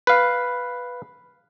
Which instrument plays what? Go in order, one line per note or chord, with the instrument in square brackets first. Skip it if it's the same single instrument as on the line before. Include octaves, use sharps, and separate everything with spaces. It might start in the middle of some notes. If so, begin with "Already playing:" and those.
[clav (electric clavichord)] B4 F5